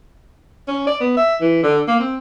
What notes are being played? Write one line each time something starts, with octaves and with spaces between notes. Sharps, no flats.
C#4
D5
B3
E5
E3
D3
A#3
C4